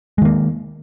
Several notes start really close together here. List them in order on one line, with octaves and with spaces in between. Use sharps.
G#3 D#3 A#3